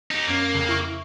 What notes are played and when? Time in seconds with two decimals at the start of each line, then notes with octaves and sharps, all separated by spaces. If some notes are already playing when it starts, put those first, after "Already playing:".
0.11 D#4 G4 C#7
0.28 F#2 A#3 C#4
0.54 F2 C#3
0.69 E4 C#6